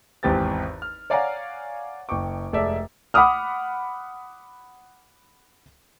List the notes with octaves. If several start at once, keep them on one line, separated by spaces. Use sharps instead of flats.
G#1 E2 C4 G4 B4 A6
F6
C#5 D5 F5 F#5 G#5 A#5
F#1 G5 C#6 D6
F1 G#3 A4 D5 E5
F#5 B5 D6 D#6 F6